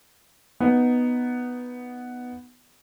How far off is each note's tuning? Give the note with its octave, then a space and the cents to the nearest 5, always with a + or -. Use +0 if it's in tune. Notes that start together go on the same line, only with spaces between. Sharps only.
B3 +0 D#4 +0